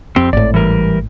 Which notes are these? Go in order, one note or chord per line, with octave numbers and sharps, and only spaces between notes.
F2 C4 G4
G#1 A2 D5
E3 G3 A#4